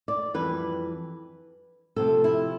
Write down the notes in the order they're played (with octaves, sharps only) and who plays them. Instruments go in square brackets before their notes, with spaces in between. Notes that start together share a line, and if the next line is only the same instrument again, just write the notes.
[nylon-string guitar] D5
F2 E3 G3 B4
C3 F3 A3 C4 A4
E4